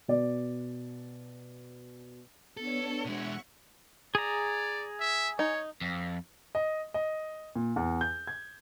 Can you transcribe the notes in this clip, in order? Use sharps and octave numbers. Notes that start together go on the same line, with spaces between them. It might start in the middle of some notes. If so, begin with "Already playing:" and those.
B2 D5
B3 D4 A4 C#5
B2 G#3 E5 F#5 C#6
G#4 D5 A#5
E5
D#4 C#5
F2
D#5
D#5
A#2
E2
G6
G#6